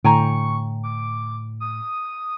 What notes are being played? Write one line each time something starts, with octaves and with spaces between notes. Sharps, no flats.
A2 D3 G5 G#5 A#5 C#6
D6
D#6